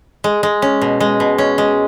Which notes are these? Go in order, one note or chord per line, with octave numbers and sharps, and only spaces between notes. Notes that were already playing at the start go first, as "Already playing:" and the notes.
G#3
G#3
C#4
B2
G#3
B2
C#4
G#3